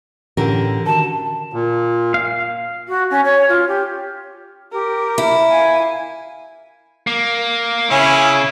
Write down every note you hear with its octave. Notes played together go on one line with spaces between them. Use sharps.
A2 D3 E3 C#4 G4 A#4
D#3 F#4 A#4 A5
A#2
F5
F#4
C#4
C#5
F4
G4
G4 A#4
E4
F5 G#5
A#3
C#3 C#4 E4